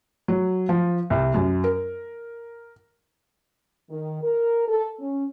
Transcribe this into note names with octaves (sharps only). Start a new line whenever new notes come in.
F#3
F3
C2
F#2
A#4
D#3
A#4
A4
C#4